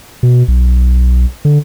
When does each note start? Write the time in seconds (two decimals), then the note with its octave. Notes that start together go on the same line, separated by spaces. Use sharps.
0.23 B2
0.48 B1
1.45 D3